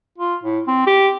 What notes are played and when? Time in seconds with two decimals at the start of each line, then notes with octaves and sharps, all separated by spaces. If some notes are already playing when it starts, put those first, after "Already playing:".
0.18 F4
0.43 A2
0.68 C4
0.87 G4